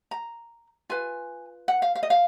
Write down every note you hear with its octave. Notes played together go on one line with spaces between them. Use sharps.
A#5
F4 B4 G#5
F#5
F5
F5
D#5
F5